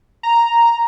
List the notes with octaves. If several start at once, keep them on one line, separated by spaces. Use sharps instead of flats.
A#5